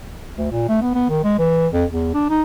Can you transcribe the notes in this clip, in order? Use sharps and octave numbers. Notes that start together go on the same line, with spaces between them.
D2
A#2
A3
B3
B3
D#3
G#3
E3
F2
E2
D4
D#4